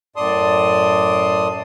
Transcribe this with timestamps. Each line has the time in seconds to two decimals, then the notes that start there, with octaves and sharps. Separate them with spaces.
0.16 F#2 A2 D5 A5 C6 D#6